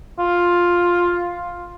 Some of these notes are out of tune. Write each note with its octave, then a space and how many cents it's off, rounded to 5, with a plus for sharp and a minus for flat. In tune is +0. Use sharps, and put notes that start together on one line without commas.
F4 +5